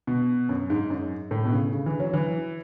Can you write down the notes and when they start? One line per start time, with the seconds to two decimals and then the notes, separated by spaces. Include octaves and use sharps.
0.07 B2
0.49 F#2
0.70 G#2
0.90 F#2
1.31 A2
1.45 B2
1.52 C#3
1.73 C#3
1.86 E3
2.00 F#3
2.13 E3